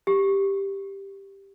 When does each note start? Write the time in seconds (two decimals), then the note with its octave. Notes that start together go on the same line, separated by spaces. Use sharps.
0.07 G4